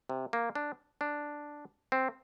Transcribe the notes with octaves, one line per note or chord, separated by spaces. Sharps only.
C3
A#3
D4
D4
C4